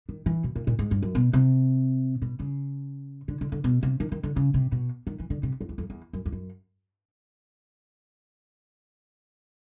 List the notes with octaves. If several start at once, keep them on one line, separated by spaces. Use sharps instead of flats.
D#3
E3
B2
A#2
A#2
G#2
G2
F#2
B2
C3
B2
C#3
D3
D3
D3
B2
C3
D#3
D#3
D3
C#3
C3
B2
D#3
E3
D3
C3
F2
E2
F2
E2
F#2
F2
F#2